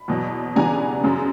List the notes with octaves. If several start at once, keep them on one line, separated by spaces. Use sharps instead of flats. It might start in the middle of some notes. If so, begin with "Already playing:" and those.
Already playing: B5
E2 B2 F#3
C#3 E3 G3 B3 D4 G#5 A#5
F#2 C#3 F#3